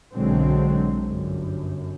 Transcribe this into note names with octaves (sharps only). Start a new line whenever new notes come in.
B1 D3 F#3 G#3 C4
G1 F#2